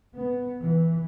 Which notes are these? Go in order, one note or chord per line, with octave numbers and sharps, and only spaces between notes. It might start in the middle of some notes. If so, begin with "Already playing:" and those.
B3
E3